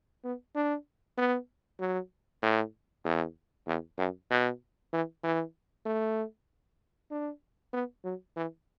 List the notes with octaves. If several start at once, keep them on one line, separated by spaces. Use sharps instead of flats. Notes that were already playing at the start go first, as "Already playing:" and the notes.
B3
D4
B3
F#3
A2
E2
E2
F#2
B2
E3
E3
A3
D4
B3
F#3
E3